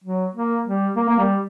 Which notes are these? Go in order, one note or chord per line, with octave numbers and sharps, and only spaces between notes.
F#3
A#3
G3
A#3
A#3
G3